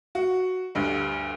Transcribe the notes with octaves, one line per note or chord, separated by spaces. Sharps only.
F#4
D2 G2